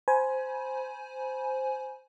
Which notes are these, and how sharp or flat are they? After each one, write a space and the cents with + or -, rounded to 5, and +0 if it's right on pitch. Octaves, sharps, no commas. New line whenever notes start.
C5 -5 G#5 +15 B5 -30